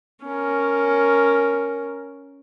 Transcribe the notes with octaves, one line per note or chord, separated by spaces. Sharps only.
C#4 A#4